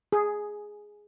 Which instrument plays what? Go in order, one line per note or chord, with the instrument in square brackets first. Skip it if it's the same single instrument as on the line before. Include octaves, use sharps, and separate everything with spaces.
[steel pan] G#4